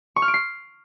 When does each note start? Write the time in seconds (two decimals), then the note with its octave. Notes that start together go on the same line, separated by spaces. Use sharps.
0.16 C#6
0.22 F6
0.28 D7
0.34 C7